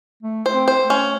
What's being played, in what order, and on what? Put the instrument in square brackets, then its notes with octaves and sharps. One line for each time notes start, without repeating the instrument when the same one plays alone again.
[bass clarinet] A3
[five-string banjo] C5
[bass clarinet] C4
[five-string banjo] C5
[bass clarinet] A3
[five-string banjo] C#4